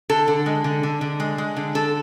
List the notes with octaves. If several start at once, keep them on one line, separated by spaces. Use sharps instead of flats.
D3 A4
D3
G#3
D3
D3
D3
G#3
G#3
D3
D3 A4